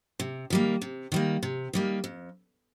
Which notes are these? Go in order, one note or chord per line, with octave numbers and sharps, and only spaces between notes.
C3
D#3 G3 A#3
C3
D#3 G3 A#3
C3
D#3 G3 A#3
F2